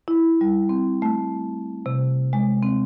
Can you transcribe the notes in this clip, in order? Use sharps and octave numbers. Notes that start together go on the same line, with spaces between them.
E4
G3
C4
A3
C3
G#3
C4